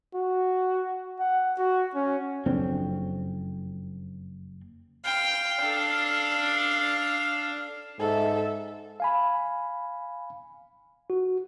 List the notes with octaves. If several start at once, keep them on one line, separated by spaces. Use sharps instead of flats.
F#4
F#5
F#4
C#4
F#1 F2 C4 D4
F5 G5
D4 A4
G#2 A4 E5
F5 G#5 B5
F#4